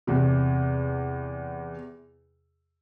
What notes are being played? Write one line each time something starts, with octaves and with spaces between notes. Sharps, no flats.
E2 C3